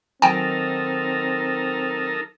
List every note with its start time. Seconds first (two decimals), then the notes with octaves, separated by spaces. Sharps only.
0.22 D#3 F#3 C4 D#4 A4 A#4 G5 G#5